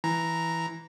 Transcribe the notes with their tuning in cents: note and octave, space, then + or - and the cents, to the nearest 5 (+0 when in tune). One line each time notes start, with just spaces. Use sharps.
E3 +0 A#5 +0